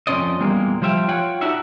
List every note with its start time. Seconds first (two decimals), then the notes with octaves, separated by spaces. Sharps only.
0.07 F2 E3 C#4 C5 D5 D#5
0.40 E2 A#2 G3 G#3 A#3
0.82 F3 G3 C5 E5 F5 G5
1.08 F4 C#5 F#5 G5
1.41 D4 D#4 F#4 G4 E5 F#5